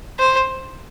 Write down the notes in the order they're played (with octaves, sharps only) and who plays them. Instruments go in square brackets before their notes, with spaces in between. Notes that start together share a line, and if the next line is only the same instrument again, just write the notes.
[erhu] C5